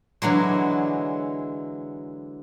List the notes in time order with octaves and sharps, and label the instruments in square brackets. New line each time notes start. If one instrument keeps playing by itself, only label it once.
[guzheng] D3 E3 F#3 G#3